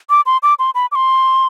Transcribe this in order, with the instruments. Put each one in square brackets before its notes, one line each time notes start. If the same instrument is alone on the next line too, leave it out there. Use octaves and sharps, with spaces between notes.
[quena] D6
C6
D6
C6
B5
D6
C6